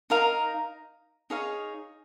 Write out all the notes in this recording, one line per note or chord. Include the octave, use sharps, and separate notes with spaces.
D#4 A#4 F5 A#5
D#4 G#4 C#5 F5